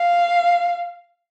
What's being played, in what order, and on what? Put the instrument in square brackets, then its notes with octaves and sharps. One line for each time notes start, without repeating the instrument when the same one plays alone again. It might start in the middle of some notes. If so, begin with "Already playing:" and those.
Already playing: [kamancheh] F5